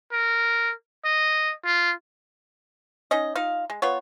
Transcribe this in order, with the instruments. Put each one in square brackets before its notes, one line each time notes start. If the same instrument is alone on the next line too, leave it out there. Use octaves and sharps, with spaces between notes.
[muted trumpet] A#4
D#5
F4
[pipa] C#4 D#4 D#5
D#4 F4 F5
G#3
B3 F4 C#5